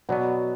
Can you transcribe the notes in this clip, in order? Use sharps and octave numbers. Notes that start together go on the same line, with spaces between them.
B2 F#3 B3 D5 F#5